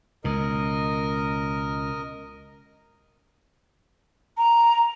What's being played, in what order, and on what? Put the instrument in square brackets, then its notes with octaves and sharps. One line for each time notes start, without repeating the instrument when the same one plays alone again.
[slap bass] C#2 B2 [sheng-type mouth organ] A#4 D#5
[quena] A#5